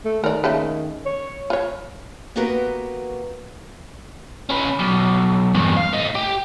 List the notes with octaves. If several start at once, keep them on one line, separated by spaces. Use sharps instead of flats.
A3
D#3 A#4 D5
C#3 A3 A#3
C#5
F4 C#5
A#3 B3 F#4 G4 A#4 B4
C#4 B4
B1
E2 G2
F5
A2 D#4
G4